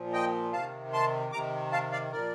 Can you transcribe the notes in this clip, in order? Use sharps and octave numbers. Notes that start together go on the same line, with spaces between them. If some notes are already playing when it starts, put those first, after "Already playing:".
Already playing: A#2 F3
D#5 G5
C3 D#3 F5 A5
A5 C6
C3 D#3 A#5 D6
F5 A5
D5 F5
A#2 F3 A#4 D5